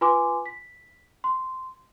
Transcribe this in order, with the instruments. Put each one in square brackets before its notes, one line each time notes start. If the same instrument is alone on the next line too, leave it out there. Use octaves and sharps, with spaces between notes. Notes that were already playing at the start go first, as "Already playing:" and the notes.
[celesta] F4 B4 G#5 C6 D6
B6
C6